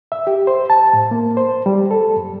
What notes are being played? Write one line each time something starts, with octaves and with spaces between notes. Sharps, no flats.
E5
G4
C5
A5
A2
A#3
C5
G3
A4
F#2